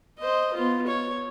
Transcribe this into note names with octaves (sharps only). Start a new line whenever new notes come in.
C5 D#5
B3 F4
C#5